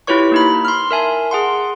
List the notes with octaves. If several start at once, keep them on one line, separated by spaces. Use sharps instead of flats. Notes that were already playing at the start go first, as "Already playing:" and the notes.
E4 F4 G4 B4 C#5 C#6
A#3 D#4 B5
C6 F6
A#4 E5 G#5 A5
G#4 F#5 C6